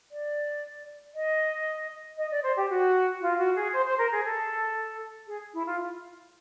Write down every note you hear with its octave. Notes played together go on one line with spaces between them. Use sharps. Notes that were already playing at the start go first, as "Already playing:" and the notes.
D5
D#5
D#5
D5
C5
G4
F#4
F4
F#4
G#4
C5
C5
A#4
G#4
A4
G#4
E4
F4